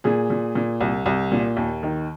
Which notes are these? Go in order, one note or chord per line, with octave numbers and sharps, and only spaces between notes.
A#2 G#4
A#2
A#2
C2
C2
A#2
D#2
D#3